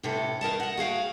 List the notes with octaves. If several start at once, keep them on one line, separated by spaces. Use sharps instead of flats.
A2 C3 C#4 A4
E2 A#4 D#5 A5
D#5 F#5
F#4 G#4 F5 G5